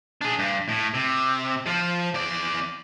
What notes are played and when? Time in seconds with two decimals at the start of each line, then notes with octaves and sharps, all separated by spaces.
0.21 D4 G#4
0.39 G2
0.68 A2
0.94 C3
1.66 F3 F4
2.14 E2 D5